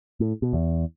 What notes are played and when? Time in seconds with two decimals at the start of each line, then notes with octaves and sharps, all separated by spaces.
0.20 A2
0.42 B2
0.53 E2